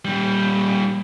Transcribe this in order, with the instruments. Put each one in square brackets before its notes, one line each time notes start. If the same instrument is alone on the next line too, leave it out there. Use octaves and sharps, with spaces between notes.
[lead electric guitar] A#2 G3